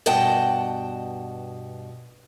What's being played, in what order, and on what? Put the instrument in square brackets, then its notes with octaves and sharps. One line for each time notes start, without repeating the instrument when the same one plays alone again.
[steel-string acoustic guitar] G2 B2 D#5 F#5 G5 A5